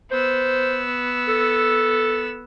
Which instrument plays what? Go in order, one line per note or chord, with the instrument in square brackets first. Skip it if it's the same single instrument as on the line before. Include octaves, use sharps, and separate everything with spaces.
[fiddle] B3 E6 [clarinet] C5
[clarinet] A4